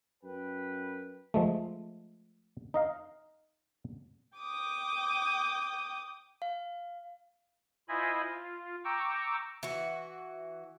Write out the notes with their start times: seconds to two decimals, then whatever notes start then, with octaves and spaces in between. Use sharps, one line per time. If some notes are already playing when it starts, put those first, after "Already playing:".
0.24 F#2 B4 G5
1.34 F3 G#3 A3
2.74 D#4 D#5 F5
4.37 G5 D6 D#6
6.42 F5
7.89 E4 F4 C5 D#5 G#5 B5
8.30 F4
8.84 G5 A#5 C#6 D6 E6
9.63 E3 F#4